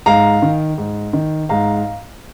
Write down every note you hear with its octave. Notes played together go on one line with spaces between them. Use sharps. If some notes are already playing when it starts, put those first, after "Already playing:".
G#2 F5 A#5
D#3
G#2
D#3
G#2 F5 A#5